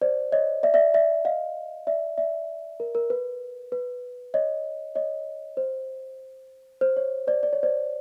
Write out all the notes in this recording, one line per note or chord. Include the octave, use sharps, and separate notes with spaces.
C5 D5
C#5 D#5
D5 E5
D5 E5
D5 E5
D#5 F5
D5 E5
D5 E5
A#4
A#4
B4
B4
C#5 D#5
C#5 D#5
C5
C5
C#5
C5 D5
D5
C#5
C5 D5